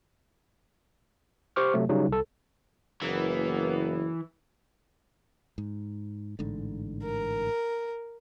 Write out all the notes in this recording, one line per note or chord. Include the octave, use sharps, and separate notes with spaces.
G4 C5 C#6 D6 F6
C3 F#3 A3
C#3 F#3 G3 D#4
C2 A4
F#1 E3 A#3 B3
G#2
A1 G#2 D3
A#4